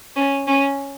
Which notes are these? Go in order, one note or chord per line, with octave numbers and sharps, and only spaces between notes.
C#4
C#4